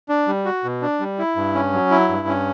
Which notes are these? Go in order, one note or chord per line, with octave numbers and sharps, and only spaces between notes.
D4
G3
F#4
B2
D4
G3
E4
G2
C#4
F#3
E4
G2
C#4